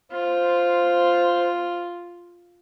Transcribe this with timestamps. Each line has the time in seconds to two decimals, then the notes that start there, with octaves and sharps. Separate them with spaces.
0.12 F4 C5